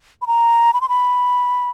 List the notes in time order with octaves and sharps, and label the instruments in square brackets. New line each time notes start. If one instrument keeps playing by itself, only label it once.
[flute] B5
A#5
B5
C6
B5